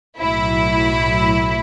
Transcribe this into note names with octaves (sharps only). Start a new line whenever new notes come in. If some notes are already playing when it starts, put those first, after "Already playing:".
B1 A2 F#3 E4